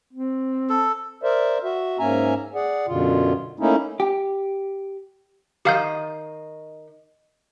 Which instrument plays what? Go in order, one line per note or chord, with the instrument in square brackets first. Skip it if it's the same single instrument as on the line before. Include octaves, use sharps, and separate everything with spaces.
[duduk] C4
[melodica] A4
[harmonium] A#4 C5 D5 E5
F#4 E5
G#2 A#3 C#4 E5 G#5 A#5
G#4 D5 F#5
F#2 B2 D3 F4
A3 A#3 C#4 D#4 E4
[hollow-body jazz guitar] G4
[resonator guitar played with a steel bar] D#3 D#5 [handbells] G4 F5 G6